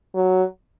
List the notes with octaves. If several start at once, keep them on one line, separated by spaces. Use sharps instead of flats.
F#3